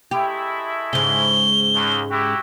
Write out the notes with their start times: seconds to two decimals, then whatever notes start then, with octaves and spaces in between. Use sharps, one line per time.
0.11 G#3 A3 E4 G4
0.93 G#2 C#3 G7
1.73 D#2
2.09 E4 F#4 G4